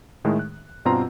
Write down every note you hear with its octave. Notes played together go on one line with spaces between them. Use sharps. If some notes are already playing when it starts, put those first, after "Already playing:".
A2 D#3 G#3 A3
F#6
G2 B2 C4 F4 A#5 C6